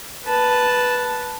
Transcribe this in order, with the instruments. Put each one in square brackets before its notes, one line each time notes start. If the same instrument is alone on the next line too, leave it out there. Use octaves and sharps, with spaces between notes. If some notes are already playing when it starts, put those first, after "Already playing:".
[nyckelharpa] B4 A5